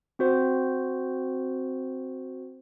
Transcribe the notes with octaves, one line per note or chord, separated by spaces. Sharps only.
C4 F#4 C5